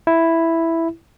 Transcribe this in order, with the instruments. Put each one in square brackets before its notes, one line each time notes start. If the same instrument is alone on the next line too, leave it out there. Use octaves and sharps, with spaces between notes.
[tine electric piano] E4